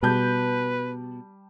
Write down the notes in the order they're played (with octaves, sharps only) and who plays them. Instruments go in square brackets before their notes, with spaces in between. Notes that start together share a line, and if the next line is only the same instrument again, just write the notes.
[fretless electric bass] B2 [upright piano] G3 A5 G6 [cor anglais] B4